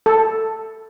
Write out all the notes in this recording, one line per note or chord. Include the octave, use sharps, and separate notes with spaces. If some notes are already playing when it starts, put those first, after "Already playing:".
A4